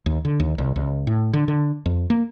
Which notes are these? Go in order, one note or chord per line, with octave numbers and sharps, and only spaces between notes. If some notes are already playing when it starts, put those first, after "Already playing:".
D#2
D3
D#2
C2
C#2
A2
D3
D3
F2
A#3